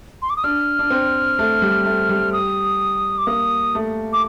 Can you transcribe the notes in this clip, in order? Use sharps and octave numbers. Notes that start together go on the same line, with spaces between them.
C6
D6
D#6
D4 F6
D4
C4
A3
G3
A3
G3
D#6
D6
A#3 D#6
A3
D6